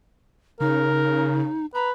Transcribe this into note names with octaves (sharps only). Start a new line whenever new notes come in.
C#3 D#4 A#4
B4 A#5